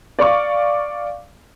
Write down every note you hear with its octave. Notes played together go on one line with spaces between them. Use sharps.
D5 F5 C#6 D6